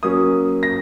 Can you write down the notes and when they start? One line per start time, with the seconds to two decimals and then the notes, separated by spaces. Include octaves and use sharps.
0.03 F#3 A#3 C#4 D#6
0.63 A#6